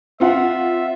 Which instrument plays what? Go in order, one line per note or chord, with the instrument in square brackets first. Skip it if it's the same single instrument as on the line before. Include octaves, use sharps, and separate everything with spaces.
[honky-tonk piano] C4 F4 F#5 [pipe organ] E5